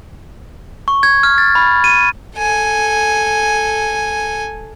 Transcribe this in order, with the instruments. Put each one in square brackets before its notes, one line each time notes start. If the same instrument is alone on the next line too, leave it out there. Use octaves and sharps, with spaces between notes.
[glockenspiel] C#6
G#6
F6
A6
B5
D#7
[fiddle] A4 G#5